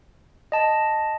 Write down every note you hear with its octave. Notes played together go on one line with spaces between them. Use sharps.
D#5 A5